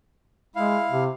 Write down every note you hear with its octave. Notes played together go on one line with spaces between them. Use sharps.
G#3 E4 F5
C3